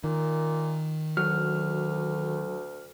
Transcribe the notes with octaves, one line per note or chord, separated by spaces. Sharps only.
A#2 D#3
D2 F#3 F6